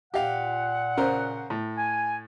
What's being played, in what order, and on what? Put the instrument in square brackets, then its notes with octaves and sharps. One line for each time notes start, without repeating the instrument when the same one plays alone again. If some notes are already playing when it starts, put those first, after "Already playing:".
[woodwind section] A#2 F#5 [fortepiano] G4 F5
[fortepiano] C#3 A#4 C5
A2
[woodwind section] G#5